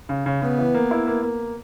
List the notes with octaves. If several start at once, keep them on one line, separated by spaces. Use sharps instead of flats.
C#3
C#3
C#3 B3
E3
A#3
E4
A#3
A#3